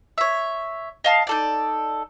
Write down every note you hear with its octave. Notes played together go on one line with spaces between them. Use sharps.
C#5 E5
D#5 F5 A5
D#4 A4 D5